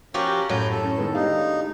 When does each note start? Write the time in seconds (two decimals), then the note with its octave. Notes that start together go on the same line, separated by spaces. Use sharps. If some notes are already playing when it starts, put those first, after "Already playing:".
0.14 F3 C#4 F#4 G4 A#4
0.50 F#2 A2 F#4 G6
0.71 A4
0.84 C#4
0.98 D#3 G#3 B3
1.14 D4 D#4 G4 F5